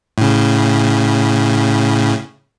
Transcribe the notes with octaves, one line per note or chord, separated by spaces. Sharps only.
A2 C#3